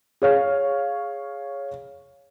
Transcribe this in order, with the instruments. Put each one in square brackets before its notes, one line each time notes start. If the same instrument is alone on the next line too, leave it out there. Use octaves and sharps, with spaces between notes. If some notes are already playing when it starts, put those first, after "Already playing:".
[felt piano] G#4 C#5 F5